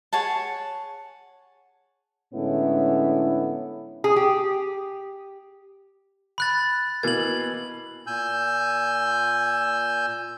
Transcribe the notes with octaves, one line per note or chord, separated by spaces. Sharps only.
G#4 C#5 F#5 A5
A2 D3 G#3 B3 C#4 E4
G#4
G4
B5 F#6 A6
B2 E3 A#3 G#6 F#7
A#2 G#5 E6 G6